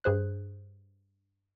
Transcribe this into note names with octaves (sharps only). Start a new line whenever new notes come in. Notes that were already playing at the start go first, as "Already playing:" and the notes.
G2 G#4 C5 F#6